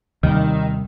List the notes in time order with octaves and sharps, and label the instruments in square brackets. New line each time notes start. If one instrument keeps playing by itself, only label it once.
[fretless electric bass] D#2 C3 G3 [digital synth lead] D#3